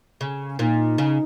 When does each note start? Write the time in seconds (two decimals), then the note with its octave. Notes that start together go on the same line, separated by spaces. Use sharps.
0.21 C#3
0.59 A#2 D#4
0.98 C#3